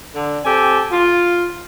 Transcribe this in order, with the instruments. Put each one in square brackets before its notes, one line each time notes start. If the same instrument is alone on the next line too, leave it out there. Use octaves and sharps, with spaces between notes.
[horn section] D3
C4 G4 A4 G#5
F4